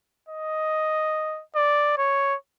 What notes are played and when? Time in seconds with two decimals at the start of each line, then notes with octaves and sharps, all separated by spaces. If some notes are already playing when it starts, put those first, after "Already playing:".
0.29 D#5
1.55 D5
1.98 C#5